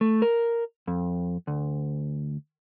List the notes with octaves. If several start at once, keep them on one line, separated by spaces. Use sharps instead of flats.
A3
A#4
F2
D2